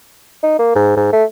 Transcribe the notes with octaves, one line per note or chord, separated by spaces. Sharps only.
D#4
A#3
G#2
G#2
A3